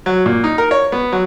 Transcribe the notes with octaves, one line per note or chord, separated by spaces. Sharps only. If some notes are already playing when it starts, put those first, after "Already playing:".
F#3
A#2
D#4
A#4
C#5
B3
F#3